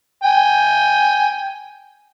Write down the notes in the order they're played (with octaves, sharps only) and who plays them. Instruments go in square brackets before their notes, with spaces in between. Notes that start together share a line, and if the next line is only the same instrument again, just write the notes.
[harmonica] G5 G#5